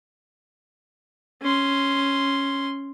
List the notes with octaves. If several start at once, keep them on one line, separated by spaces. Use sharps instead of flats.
C#4 C6